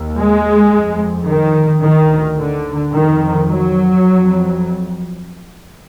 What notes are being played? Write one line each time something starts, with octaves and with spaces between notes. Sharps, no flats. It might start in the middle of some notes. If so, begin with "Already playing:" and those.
Already playing: D#2
G#3
F2
D#3
D2 D#3
D3
F2 D#3
F#3
F2